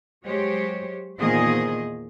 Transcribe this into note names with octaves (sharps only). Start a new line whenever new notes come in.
F#3 G#3 G4 C5 C#5
E2 A#2 D#3 G#4 C5 D#5